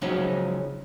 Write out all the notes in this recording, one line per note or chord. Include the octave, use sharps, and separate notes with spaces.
C#3 F3 F#3 G#3 C#4 D#4